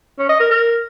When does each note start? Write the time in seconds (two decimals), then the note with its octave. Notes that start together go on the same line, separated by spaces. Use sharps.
0.18 C#4
0.29 D#5
0.40 A#4
0.50 A#4